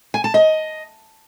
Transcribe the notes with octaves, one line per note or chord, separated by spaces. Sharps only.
G#5
A5
D#5